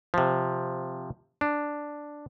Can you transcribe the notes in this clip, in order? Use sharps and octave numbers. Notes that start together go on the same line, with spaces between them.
C3 F3
D4